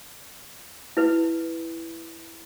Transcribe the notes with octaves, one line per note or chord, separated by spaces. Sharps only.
E4 B4